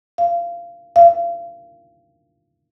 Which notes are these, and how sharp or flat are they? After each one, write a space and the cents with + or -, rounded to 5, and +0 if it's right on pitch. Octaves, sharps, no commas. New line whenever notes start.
F5 -20
F5 -30